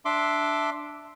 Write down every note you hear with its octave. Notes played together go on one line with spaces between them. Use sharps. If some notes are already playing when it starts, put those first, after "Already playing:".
D4 E5 C6 D6